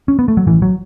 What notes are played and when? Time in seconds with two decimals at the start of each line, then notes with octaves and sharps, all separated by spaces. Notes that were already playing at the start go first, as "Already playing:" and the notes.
0.08 C#4
0.19 B3
0.28 A3
0.37 F#3
0.46 A1 A2 E3
0.62 F#3